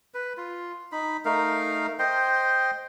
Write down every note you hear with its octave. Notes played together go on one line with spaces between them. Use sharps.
B4
F4
D#4 B5
A3 D#4 A#4 F5
C5 D#5 G5 C6